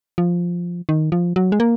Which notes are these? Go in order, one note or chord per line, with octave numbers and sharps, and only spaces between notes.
F3
D#3
F3
F#3
G#3
A#3